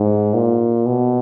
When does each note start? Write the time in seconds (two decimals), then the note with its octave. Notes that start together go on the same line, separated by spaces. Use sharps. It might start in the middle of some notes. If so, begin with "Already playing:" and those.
Already playing: G#2
0.34 A#2
0.86 B2